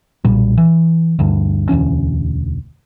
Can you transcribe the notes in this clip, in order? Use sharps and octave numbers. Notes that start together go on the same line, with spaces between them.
B1 A#2 G3
E3
D2 G2
E1 D2 E3 C#4